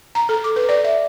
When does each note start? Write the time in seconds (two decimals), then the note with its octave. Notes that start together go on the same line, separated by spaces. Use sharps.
0.15 A#5
0.29 A4
0.44 D6
0.56 B4
0.69 D5
0.84 E5